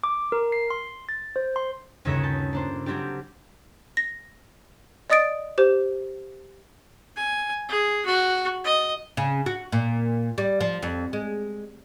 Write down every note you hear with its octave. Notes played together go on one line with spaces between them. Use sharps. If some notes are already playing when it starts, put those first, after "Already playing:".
D6
A#4
C7
C6
A6
C5
C6
G1 D#2 C#3 C#5 E5 A#6
A5 G6
A#3 D4 C5
F#3 G3 C4 D4 G4
A#6
D5 D#5 D#6 A6 D7
G4 C5
G#5
G#4
F#4
D#5
C#3
F#4
A#2
G3
F3
F2
G#3